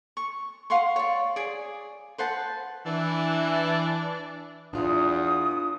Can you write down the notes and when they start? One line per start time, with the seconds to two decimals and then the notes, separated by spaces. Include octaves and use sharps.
0.17 C#6
0.70 F5 F#5 C6 C#6
0.96 C#5 D5
1.36 G#4 D5
2.18 B4 C5 F#5 A5
2.86 E3 D4
4.73 E2 D4 F4 D#6